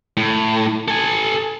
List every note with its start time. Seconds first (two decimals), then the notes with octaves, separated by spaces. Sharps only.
0.17 A2
0.88 A4 G#5